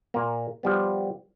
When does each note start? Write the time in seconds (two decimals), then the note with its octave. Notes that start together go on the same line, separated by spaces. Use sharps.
0.14 A#2 A#3
0.63 F3 G3 B3